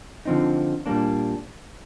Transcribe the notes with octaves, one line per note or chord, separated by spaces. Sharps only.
D3 F3 C4 D#4
A#2 G3 A#3 D4